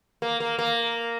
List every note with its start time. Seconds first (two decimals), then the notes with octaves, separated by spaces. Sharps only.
0.22 A#3
0.40 A#3
0.59 A#3